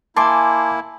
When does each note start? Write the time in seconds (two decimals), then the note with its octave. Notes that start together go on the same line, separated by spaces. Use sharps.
0.17 A#3 E4 G#5 A5 C6 D6